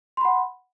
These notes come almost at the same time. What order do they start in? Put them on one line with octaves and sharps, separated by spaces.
C6 B5 F#5